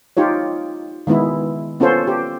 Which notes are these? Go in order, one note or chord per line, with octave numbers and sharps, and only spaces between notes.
D#4 F4 G4 C#5
D#3 G#3 B3 E4
B3 C#4 F4 A4 C5 C#5
G4